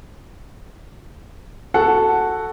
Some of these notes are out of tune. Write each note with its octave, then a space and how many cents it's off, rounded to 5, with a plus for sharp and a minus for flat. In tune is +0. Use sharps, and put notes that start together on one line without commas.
F#4 +0 A4 +0 F#5 +0